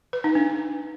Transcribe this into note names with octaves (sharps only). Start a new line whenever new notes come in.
B4
D#4
D4